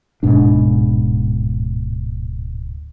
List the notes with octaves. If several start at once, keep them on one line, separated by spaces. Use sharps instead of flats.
D1 G#2 B2 D4